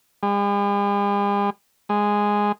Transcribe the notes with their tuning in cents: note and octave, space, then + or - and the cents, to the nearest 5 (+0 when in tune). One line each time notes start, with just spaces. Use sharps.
G#3 -45
G#3 -5